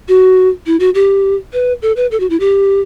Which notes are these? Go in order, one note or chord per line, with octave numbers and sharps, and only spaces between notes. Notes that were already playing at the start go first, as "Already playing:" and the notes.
F#4
E4
F#4
G4
B4
A4
B4
A4
F#4
E4
G4